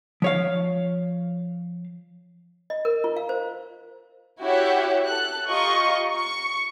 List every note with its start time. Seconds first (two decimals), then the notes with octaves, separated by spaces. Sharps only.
0.22 F3 C#5 F5
2.70 D#5
2.85 A#4
3.04 F4
3.17 F5
3.29 C5
4.43 E4 F#4 G4 C#5 E5 F#5
5.06 A4 F#6
5.50 F4 G4 D#5 A#5 C#6
6.15 C#6 C#7